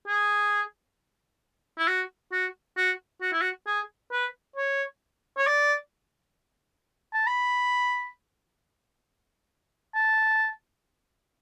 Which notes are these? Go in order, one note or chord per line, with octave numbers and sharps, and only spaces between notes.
G#4
E4
F#4
F#4
F#4
F#4
E4
F#4
G#4
B4
C#5
C#5
D5
A5
B5
A5